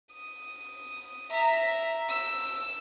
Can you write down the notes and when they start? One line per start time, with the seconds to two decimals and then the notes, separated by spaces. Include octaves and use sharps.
0.13 D#6
1.31 E5 A#5
2.09 E6